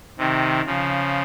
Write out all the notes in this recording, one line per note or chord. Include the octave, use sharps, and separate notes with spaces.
C3 D#3
C#3 F3